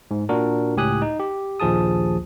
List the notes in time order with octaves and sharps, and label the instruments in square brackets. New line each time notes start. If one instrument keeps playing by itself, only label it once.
[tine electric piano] G#2
A#2 D4 F#4 A#4
C#2 A2 G4 G#5 D#6 F#6
D#4
G4
A#1 D#2 F3 G#4 A5 D#6